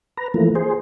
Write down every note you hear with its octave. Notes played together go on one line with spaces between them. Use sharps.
B4 A#5
E3 F3 A3 A#3
G#4 C5